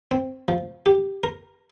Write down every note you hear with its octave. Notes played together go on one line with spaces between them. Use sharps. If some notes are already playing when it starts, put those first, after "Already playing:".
C4
F3
G4
A#4